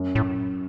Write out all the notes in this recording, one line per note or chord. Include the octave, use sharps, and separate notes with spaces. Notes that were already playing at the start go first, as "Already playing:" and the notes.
Already playing: F#2
A2